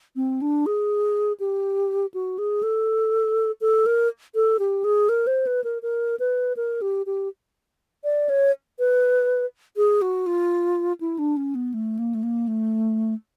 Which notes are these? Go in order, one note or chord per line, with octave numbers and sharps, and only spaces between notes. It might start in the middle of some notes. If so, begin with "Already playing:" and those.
C4
D4
G#4
G4
F#4
G#4
A4
A4
A#4
A4
G4
G#4
A#4
C5
B4
A#4
A#4
B4
A#4
G4
G4
D5
C#5
B4
G#4
F#4
F4
E4
D4
C#4
B3
A3
A#3
A3
A#3
A3